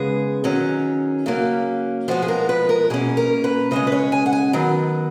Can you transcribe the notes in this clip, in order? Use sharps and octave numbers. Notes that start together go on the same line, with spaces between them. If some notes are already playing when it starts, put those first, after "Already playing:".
Already playing: C#3 G#3 B3 G#4
D#3 F#3 C#4
C#3 F#3 A#3 C#4
F3 G#3 B3 F#4
G#4
A#4
B4
A#4
B2 A#3 C#4 G#4
A#4
B4
C#3 G#3 C#4 D#5
B4
C#5
G#5
F#5
G#5
D#3 F#3 B3